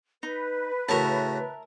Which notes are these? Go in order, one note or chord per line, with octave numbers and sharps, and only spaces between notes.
D#4 B4
A2 C#3 F#4 A#4 E5 A5